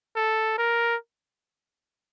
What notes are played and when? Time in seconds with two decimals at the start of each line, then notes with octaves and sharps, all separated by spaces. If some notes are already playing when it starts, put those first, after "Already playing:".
0.16 A4
0.58 A#4